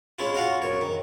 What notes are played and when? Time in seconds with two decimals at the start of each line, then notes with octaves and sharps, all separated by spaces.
0.19 G#3 C#4 E4 F4
0.34 F4 F#4 F5 F#5
0.62 F#2 C#5
0.81 D#3